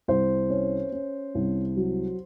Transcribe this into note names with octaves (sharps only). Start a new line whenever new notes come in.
C2 C5
C#4
C#4
C2
F#3